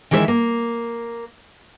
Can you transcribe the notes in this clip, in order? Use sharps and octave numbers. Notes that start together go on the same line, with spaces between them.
D#3 E3 G#3 C#5 E5
A#3